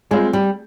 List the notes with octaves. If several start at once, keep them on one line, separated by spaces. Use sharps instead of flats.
G3 G#3 C4 F4
G3